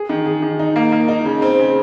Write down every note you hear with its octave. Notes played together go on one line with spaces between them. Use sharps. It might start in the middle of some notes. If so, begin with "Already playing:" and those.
Already playing: G#4
D#3
G#4
D#3
D#4
A#3
A#3
D#4
C#3
C4
C#3